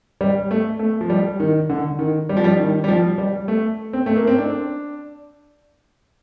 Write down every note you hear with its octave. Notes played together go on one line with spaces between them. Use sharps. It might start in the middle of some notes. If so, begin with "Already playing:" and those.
G3
A3
A3
F3
G3
D#3
D3
D#3
G3
F3
G3
D#3
G3
F3
G3
A3
C4
A3
A#3
C4
D4